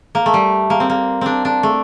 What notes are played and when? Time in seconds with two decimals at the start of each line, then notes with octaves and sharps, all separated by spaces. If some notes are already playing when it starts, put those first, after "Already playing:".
0.15 A#3
0.26 A3
0.34 G3
0.70 A#3
0.80 C4
0.90 A#3
1.21 C4 D4
1.45 D4
1.63 A3